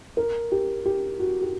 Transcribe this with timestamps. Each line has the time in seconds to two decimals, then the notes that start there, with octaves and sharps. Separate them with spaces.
0.17 A#4
0.52 G4
0.86 G4
1.20 F#4
1.42 G4